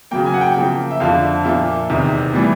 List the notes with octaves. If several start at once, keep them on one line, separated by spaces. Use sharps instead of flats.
C#3 F#3 A#3 G5
G#5
F#5
G5
C#3 F3 A#3 G5
E5
F2 D3 F3 F5
A#2 F3 A#3 E5
E2 C3 D#3
A2 E3 G3